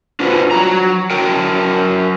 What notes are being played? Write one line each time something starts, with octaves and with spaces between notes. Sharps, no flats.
D4 F4 F#4 B4 C5
F#3 A#5
F#3 A#4 G5